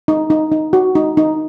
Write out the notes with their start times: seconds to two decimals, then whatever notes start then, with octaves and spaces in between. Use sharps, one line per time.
0.08 D#4
0.30 D#4
0.52 D#4
0.73 F#4
0.95 D#4
1.17 D#4